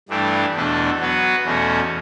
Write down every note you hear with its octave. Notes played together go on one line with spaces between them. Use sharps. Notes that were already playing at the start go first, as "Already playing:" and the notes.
G2 E3 A3 D4 G4
E2 B2 A3 D4 A4
F#3 B3 F#4 B4
E2 B2 A3 C#4 F#4